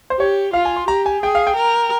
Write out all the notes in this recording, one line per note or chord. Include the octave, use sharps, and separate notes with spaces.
C5
G4 C#5
F4 F5
G#5
C6
G4 A#5
G#5
G#4 G5
F5
G5
A#4